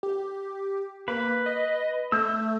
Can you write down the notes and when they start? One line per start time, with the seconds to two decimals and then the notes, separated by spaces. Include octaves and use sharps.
0.03 G4
1.08 A#3 B4
1.46 D#5
2.12 A3 E6 G6